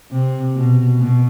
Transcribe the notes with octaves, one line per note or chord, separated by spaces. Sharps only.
C3
B2
B2